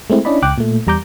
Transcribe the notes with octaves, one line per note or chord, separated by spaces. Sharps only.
G#3 A3 C4 E4
C#4 D4 E4 D5 D#5 B5
C#2 G5 D6 F#6
A#2 A3
E2 G3 A#5 D6 G6